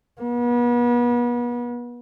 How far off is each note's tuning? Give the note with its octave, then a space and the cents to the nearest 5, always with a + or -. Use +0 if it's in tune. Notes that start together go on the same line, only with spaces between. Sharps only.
B3 -35